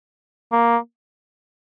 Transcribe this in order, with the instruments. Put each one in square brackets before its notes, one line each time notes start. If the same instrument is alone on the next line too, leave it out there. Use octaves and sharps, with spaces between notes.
[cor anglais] A#3